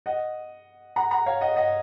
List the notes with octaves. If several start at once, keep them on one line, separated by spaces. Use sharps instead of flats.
D#5 F#5
F#5 A#5
F#5 A#5
C#5 F5
D#5 F#5
D#5 F#5